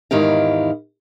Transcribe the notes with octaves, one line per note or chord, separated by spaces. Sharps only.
E2 G#2 D#3 E4 G4 F5